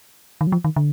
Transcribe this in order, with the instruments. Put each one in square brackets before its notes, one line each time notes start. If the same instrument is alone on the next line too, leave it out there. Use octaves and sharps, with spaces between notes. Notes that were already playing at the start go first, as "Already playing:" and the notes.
[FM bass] D#3
F#3
F3
D#3
D3